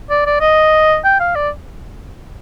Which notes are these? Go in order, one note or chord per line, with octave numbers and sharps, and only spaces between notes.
D5
D5
D#5
G5
F5
D5